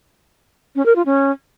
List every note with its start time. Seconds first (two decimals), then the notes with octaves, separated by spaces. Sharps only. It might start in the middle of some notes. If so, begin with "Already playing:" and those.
0.76 C#4
0.86 A#4
0.96 F4
1.06 C#4